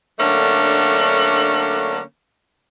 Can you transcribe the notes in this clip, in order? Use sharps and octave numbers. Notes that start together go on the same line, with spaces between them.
D3 F#3 A3 A#3 C#4 D4